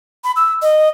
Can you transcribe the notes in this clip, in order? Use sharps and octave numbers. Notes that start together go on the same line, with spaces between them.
B5
E6
D#5